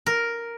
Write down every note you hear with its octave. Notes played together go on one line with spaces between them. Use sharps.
A#4